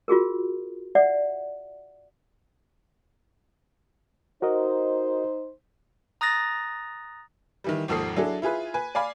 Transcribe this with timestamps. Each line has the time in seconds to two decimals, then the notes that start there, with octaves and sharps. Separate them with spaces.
0.08 F4 F#4 G#4 A#4
0.95 D5 E5 F#5
4.42 D#4 F#4 A#4 C5 D#5
6.21 A#5 D#6 F#6 A6 A#6
7.64 D#3 E3 G3
7.88 G#1 D#2 F3 A4 D#6 C7
8.16 F#3 D4 E4 G#4 A4
8.42 E4 F4 G#4 B4
8.74 B4 G#5
8.95 D5 F5 G#5 B5